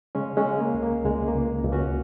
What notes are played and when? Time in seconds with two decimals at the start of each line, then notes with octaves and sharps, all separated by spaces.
0.15 C#3 G#3 C#4
0.37 G#3 C#4
0.46 C#3
0.60 A#3
0.74 C#2
0.83 A#3
1.05 C#2 G#3
1.28 A#3
1.35 C#2
1.64 C#2
1.72 C#4 F#4